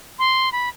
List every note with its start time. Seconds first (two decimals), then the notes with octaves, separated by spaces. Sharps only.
0.19 C6
0.52 B5